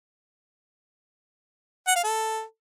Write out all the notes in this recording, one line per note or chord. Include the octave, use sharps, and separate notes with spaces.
F#5
F5
A4